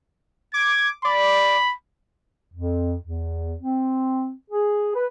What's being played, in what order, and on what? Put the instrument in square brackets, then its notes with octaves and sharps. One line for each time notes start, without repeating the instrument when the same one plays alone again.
[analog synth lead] D6 [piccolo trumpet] G#6
[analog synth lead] D5 [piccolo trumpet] B5
[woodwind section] F2
E2
C4
G#4
B4